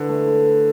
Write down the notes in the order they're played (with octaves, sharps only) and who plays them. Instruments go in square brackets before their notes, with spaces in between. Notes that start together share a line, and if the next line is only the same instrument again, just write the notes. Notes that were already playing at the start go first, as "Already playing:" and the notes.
Already playing: [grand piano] D3 [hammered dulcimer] E4 B4
[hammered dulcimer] A3
E4
B4